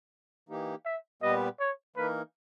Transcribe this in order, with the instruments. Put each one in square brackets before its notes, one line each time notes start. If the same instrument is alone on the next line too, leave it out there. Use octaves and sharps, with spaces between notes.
[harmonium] E3 A#3 D#4 G4
[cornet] E5
[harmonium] A#2 G3 B3 G4 B4 [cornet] D#5
[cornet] C#5
[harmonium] E3 A#3 D#4 A#4 [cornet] B4